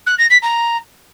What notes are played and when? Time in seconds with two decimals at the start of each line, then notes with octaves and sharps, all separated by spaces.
0.06 F#6
0.18 A#6
0.30 B6
0.42 A#5